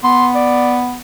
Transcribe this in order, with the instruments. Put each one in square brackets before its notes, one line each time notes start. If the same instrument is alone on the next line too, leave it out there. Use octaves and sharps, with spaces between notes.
[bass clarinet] B3 [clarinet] C6
[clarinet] D5